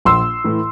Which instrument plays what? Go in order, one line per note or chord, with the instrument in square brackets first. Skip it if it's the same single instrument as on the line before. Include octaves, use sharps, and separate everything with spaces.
[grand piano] A#1 C6 E6
A2 E3